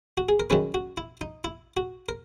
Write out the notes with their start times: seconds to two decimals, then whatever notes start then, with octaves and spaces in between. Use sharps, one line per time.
0.17 F#4
0.29 G#4
0.40 A#4
0.50 F#2 D#3 G#3 C#4 B4
0.74 F#4
0.97 E4
1.21 D#4
1.44 E4
1.77 F#4
2.09 A#4